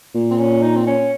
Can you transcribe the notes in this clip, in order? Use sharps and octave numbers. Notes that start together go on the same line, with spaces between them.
A#2
C4
C#4
D#4
C4
C#4